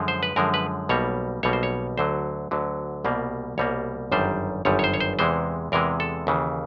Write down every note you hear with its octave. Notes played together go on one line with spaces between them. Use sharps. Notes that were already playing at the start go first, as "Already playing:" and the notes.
Already playing: F#2 D3 F3 G#3
C5
B4
F#2 D3 F3 G#3 A#4
B4
B1 B2 G3 A#3 C#5
B1 B2 G3 A#3 C#5
C5
C#5
D2 D3 F#3 C5
D2 D3 F#3
C2 B2 G3 A#3
C2 B2 G3 A#3 C#5
G1 F#2 D#3 G3 C5
G1 F#2 D#3 G3 C#5
C#5
C5
C#5
C5
E2 C3 E3 G#3 C5
E2 C3 E3 G#3 A#4
A4
D#2 C#3 E3